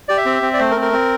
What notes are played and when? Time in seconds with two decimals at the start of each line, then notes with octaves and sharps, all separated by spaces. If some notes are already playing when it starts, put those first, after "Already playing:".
0.09 G4 D5
0.17 E5
0.26 C4
0.42 C4
0.54 D5
0.59 A3 C5
0.71 A#4
0.76 C4
0.82 A#4
0.93 C4